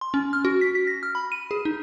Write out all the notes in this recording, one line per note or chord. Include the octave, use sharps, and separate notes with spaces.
C6
C#4
F6
F#4
B6
B6
A#6
F6
B5
D#7
G#4
D#4